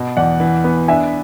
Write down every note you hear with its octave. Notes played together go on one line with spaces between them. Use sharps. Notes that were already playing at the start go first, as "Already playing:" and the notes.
Already playing: B2
E2 D5 F#5
E3
B3
D4 E5 G#5